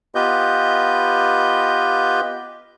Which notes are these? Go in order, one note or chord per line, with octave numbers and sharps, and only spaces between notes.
B3 F4 G4 B4 D#5 G6